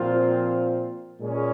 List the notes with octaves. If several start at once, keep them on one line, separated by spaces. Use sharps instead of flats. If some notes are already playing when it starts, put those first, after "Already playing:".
Already playing: A#2 F3 C4 F4
A#2 G#3 C#4 G#4